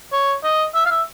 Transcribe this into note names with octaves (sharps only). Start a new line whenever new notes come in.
C#5
D#5
E5
F5
E5